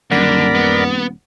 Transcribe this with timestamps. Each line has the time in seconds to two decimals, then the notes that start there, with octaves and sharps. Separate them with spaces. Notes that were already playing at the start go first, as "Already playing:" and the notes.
0.11 D#1 A#1 F#2 D3 A#4 D5 F#5 B5
0.55 B3